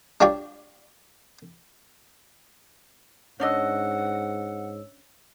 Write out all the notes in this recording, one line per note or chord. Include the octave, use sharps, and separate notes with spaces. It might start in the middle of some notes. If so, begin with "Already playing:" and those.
D4 F4 G4 C#5 D5
G#2 C#4 D4 C#5 D#5 F#5 E6